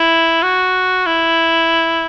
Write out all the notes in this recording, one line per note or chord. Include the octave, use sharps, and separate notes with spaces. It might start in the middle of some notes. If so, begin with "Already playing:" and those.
Already playing: E4
F#4
E4